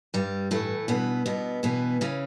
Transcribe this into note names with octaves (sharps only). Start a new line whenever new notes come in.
G2 G3
A2 E3 A3
G2 B2 B3
G2 B2 B3
B2 E3 B3
C#3 E3 C#4